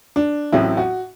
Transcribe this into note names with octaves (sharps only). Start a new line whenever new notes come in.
D4
A1 A2 F#3 C4 E4
F#4